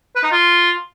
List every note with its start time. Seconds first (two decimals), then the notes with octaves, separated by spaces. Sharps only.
0.15 B4
0.23 D#4
0.31 F4